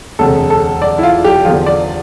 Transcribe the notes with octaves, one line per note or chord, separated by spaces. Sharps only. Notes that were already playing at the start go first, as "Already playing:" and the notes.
E1 D2 C3 A4
A4
D5
E4
F4
G4
E2 D3 F3 F4
D5